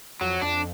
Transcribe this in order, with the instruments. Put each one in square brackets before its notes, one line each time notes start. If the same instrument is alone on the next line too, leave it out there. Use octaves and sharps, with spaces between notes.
[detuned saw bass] F2 [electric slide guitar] F#3
[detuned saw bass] F2 [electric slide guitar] D4